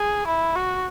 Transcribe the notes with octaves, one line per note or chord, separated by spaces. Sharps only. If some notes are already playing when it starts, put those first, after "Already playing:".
Already playing: G#4
E4
F#4